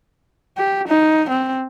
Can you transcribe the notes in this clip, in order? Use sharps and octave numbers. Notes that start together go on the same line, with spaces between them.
G4
D#4
C4